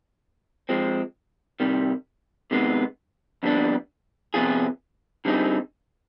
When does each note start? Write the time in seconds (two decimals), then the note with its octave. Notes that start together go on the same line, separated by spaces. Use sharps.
0.69 F3 G#3 C4
1.60 C3 D#3 G3
2.51 C3 D#3 G#3 B3
3.43 F2 D3 G3 B3 D4
4.34 C3 F3 B3 F4 G#4
5.25 D3 G3 C4 D#4 G#4